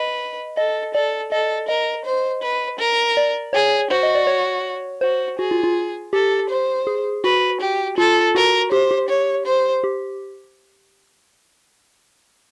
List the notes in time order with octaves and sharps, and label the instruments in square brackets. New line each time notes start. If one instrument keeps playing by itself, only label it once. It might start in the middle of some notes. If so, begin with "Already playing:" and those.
Already playing: [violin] B4 [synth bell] D#5
[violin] A4 [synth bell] D#5
[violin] A4 [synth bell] D5
[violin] A4 [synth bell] D#5
[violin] A#4 [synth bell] D#5
[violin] C5
B4
A#4
[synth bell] D5
[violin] G#4 [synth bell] C#5
[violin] F#4 [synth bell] C5
[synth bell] D#5
D5
C#5
[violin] F#4 [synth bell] C5
[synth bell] F#4 [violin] G#4
[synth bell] F4
F4
[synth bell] G4 [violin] A4
[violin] C5
[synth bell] G#4
[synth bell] F#4 [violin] B4
[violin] G4
[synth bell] F4 [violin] A4
[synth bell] F#4 [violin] A#4
[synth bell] G4 [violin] C5
[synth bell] G4
[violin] C#5
C5
[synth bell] G4